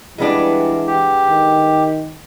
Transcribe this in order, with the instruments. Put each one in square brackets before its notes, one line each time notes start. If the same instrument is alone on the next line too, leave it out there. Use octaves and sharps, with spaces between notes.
[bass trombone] E3 [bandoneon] G3 [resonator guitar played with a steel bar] G#3 B3 D4
[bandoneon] G4
[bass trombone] D#3